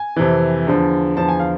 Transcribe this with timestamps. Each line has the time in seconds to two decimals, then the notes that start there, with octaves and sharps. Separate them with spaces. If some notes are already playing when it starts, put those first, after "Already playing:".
Already playing: G#5
0.16 F2 C3 E3
0.67 E2 D3 F3
1.17 E2 D3 F3 A5
1.29 G#5
1.40 F5